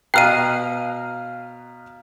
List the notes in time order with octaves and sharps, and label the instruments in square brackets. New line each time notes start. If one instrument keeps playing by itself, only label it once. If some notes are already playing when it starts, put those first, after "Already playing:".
[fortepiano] B2 F#6 [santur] F5 A#5 [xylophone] G5 F6 D#7